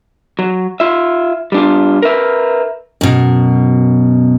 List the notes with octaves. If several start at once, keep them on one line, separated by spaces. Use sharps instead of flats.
F#3
F4 E5
G3 D4 F4
A#4 B4 E5
F#2 B2